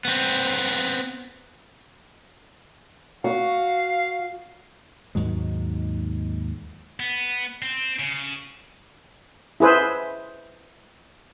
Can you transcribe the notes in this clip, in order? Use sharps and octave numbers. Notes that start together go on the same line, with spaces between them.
B3 C4
F#4 F5
D#2 G#2 F#3 G#3
B3
C4
C#3
E4 G#4 B4 C5 E5